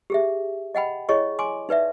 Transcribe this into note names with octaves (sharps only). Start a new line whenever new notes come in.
G4 G#4 E5
D#5 F#5 G5 B5
E4 G#4 C#5 D#5 C#6
G#5 C6 D6
D#4 B4 D5 E5